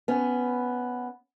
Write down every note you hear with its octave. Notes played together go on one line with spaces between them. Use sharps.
B3 C#4